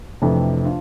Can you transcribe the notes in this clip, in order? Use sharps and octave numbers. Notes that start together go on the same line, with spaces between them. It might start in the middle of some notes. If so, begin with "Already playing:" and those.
F2 C3 E3 A3 D4
D4 F4